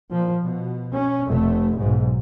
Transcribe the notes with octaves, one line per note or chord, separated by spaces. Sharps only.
A#2 F3
B2
C#4
F1 A3
B1 G#2